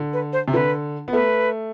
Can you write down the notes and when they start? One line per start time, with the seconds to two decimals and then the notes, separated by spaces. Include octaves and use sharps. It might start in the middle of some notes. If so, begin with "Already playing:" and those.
Already playing: D3
0.13 B4
0.33 C5
0.48 C3
0.53 D3 B4
1.08 B3
1.13 A3 B4